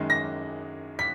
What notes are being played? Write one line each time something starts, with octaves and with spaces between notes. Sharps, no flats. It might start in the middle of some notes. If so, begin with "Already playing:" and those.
Already playing: F#2 D#3 G#3
A#6
B6